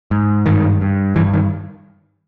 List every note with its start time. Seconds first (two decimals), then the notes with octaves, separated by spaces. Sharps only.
0.11 G#2
0.46 G2 D#3
0.81 G2
1.16 G2 E3
1.34 D#3